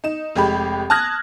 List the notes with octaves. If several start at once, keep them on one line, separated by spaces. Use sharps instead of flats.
D#4 E7
F1 G#3 G4 B5
A5 D#6 F6 F#6 G#6 A#6